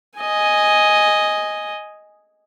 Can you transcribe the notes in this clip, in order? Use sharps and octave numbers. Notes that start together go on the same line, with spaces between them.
D#5 G#5